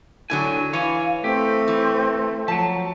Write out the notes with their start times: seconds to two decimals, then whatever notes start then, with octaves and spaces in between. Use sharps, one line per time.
0.30 A2 D3 F#3 G#5
0.73 E3 C#5 F5 G#5
1.24 A3 C4 G4
1.68 E3
2.48 F3 F#3 A5